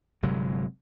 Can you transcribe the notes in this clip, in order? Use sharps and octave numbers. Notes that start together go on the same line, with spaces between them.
G1 C3 F#3 G#3